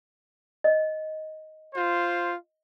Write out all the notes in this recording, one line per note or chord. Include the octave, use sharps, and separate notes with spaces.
D#5
F4 C5